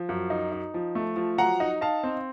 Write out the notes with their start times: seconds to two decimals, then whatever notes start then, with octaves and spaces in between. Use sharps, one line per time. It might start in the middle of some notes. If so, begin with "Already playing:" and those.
Already playing: F3
0.09 F#2
0.30 D#4
0.52 D#4
0.74 F3
0.95 A3
1.16 F3
1.38 F#3 F#5 A#5
1.60 D#4
1.81 D#4 F5 A5
2.03 C4